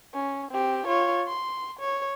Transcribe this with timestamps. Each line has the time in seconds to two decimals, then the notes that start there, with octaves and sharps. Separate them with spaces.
0.14 C#4
0.51 C4 G4
0.86 F4 C#5
1.27 C6
1.79 C#5